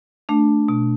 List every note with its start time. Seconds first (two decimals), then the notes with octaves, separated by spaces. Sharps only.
0.29 A3 D4
0.68 B2